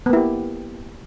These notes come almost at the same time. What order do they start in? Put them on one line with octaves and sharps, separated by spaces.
B3 A#3 E4 G4